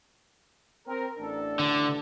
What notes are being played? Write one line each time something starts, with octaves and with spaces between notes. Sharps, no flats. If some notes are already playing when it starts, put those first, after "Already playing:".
C4 A#4
A1 D4 A4
D3